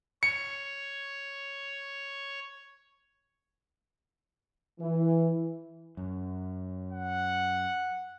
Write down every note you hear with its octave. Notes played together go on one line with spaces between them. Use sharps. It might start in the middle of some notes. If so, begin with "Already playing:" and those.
C#5 C#7
E3
F#2
F#5